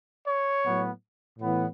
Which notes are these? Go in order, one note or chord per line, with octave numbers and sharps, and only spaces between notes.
C#5
A2 F#3 B3
A2 E3 B3